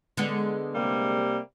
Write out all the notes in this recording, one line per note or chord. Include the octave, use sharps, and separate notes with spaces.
D3 G#3 B3
C3 G3 A#3